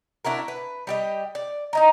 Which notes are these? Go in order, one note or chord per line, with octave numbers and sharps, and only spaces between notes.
D4 E4 F#4 A#4
B4
G3 G4 D#5
D5
D#4 D#5 A#5